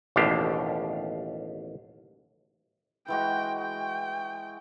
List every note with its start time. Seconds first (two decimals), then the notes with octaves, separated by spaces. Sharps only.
0.16 A1 D#2 B2 D4 G4 F5
3.08 E3 G#3 F#4 G5
3.60 G5